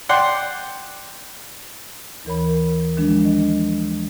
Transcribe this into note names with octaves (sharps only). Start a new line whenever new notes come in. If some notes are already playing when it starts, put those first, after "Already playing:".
D5 F#5 G5 C6
D#2 E3 A#4 C#5 B5
D#3 F3 G#3 D4
D4 D#5